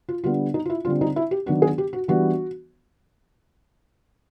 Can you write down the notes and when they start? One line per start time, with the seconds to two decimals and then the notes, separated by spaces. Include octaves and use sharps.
0.09 F4
0.24 D3 G3 B3 D4 F4
0.54 D#4
0.65 F4
0.70 E4
0.85 D3 G3 C4 F4
1.01 D#4
1.16 E4
1.31 G4
1.46 D#3 F#3 B3 D4 F#4
1.62 G#4
1.78 G4
1.93 F#4
2.08 E3 G3 B3 D4 F#4